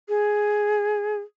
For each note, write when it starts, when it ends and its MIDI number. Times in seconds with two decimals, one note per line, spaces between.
0.09 1.19 68